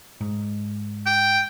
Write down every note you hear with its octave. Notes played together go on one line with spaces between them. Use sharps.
G#2
G5